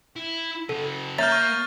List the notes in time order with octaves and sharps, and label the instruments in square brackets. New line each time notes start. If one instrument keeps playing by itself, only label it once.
[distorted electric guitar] E4
[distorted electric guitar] C#3 F#4 [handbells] A4
[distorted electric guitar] A#3 [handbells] C#5 E5 A#5 [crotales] F6 G6 A6
[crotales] C#6 G6